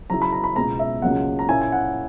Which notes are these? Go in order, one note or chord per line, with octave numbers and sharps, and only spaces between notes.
C#3 F#3 C#4 E4 A#5
B5
A#5
B5
C#2 B2 G#3 B3 A#5
E5
C#2 C#3 F#3 A#3 F#5
A#5
A#2 A#3 C#4 E4 G#5
G#5
F#5